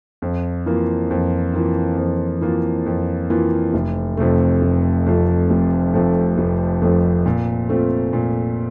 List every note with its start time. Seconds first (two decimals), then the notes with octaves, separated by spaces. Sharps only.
0.22 F2
0.66 E3 A#3 F4
1.11 F2
1.54 E3 A#3 F4
1.97 F2
2.41 E3 A#3 F4
2.86 F2
3.30 E3 A#3 F4
3.74 F1
4.17 F2 C3 F3 A3
4.62 F1
5.06 F2 C3 F3 A3
5.50 F1
5.94 F2 C3 F3 A3
6.37 F1
6.82 F2 C3 F3 A3
7.26 A#2
7.69 A3 C4 F4
8.13 A#2